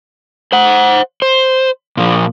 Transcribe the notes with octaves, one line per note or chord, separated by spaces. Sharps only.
C5 F#5
C5
A#2 F3